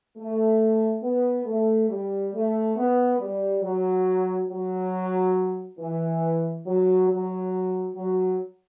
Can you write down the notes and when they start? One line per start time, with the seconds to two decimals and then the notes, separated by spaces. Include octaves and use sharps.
0.17 A3
1.03 B3
1.46 A3
1.89 G3
2.33 A3
2.76 B3
3.19 G3
3.63 F#3
4.50 F#3
5.79 E3
6.66 F#3
7.10 F#3
7.96 F#3